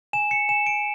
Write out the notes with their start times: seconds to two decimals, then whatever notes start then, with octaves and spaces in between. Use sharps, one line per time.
0.13 G#5 E7
0.31 C#7
0.49 G#5 E7
0.66 D7